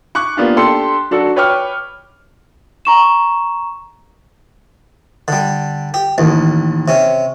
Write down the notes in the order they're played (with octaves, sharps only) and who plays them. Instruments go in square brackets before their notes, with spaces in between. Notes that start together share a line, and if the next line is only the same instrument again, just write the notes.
[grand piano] C#6 D6 F#6
A#3 B3 D4 F4 G4
D4 G4 A4 D5 G5 C6
F#3 D4 F#4 A4
B4 C#5 G5 D6 F6
[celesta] A#5 C#6 E7
[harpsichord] D3 G3
G4
A1 D#2
C3 C#4